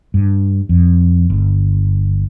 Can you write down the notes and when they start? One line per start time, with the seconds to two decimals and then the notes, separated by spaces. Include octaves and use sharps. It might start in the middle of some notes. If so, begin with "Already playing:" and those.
0.14 G2
0.69 F2
1.30 G1